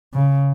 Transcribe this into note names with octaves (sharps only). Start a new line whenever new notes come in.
C#3